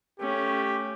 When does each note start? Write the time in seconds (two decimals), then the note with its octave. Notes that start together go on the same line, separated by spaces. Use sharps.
0.20 A3 C#4 G4